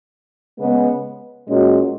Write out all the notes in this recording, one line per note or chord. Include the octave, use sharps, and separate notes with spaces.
C#3 G#3 B3
A#2 G#3 C#4 F#4